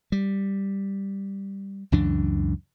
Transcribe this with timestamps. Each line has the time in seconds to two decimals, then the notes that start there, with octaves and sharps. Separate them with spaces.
0.12 G3
1.92 C#2 F#2 E3 D4